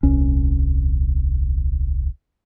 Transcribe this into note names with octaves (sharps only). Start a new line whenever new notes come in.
D#1 C2 C#4